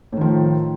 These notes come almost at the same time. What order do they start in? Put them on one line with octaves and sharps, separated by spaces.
A2 D#3 F3